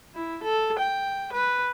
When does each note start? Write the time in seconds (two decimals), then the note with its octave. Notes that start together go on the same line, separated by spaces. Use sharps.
0.14 E4
0.43 A4
0.80 G5
1.33 B4